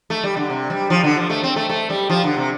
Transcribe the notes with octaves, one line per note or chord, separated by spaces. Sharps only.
A3
G3
D3
C3
G3
F3
D3
F3
A3
C4
A3
A3
G3
F3
D3
C3